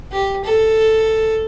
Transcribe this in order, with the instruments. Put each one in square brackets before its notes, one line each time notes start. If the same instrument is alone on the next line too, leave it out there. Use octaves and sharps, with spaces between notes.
[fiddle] G4
A4